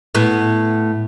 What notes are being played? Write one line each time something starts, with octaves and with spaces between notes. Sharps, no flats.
A2 B3